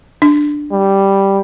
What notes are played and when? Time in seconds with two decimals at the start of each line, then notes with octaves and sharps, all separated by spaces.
0.22 D4
0.72 G3